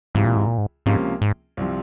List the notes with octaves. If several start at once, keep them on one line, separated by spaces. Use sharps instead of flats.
C#2 G#2 C3 E3
A#2
G#2
A#2
G#2
C#2 G#2 C3 F3 A#3 C#4
G#2
C2 C3 F3